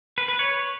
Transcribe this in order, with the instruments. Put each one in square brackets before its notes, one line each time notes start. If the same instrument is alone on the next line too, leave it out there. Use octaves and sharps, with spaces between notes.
[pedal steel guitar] B4
B4
C#5